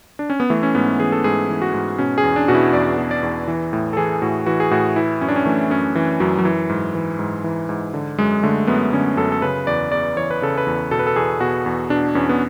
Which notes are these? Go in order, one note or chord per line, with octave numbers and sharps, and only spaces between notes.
D4
C#4
B3
E3 A3
C#4
G#2 B3
E3 G#4
A4
G#2 G#4
E3
F#4
G#2
B2 C#4
G#4
E2
D4
B2 F#4
E4
E2 D5
B2
D5
E2
E3
A2
A4
E3 G#4
A2 F#4
E3 F#4
G#4
A2 F#4
E3 E4
F#2 C#4
D4
C#4
E3 A3
F#2 C#4
E3
F#2 F#3
F#3
E3
G#2
E3
G#2
E3
G#2
D3
F#2 G#3
D3 A3
F#2 B3
D3 C#4
F#2 A4
A4
C#3 B4
E2 D5
E2 D5
E3 C#5
B4
C#3 A4
B4
E2
B2 A4
B4
A4
E2 G#4
B2 F#4
E2
B2 D4
E2 C#4
B3